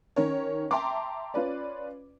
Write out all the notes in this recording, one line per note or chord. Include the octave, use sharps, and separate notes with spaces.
D#3 C#4 A#4 C#5
E5 G5 A5 A#5 C6 D6
C#4 F4 B4 D5